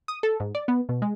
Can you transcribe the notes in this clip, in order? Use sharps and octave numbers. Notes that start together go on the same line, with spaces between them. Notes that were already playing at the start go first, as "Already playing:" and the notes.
D#6
A4
G#2
D5
B3
B2
G#3